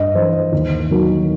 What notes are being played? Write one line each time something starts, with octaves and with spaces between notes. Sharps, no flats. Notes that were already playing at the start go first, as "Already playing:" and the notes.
Already playing: G2 D#5
E3 C5
D#2
D#3 F#3